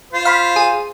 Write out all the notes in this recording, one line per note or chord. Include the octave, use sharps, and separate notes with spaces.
F4 C5
F5 B5 C6
G#4 D#7